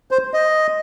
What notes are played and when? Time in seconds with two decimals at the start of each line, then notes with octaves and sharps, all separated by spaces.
0.11 C5
0.34 D#5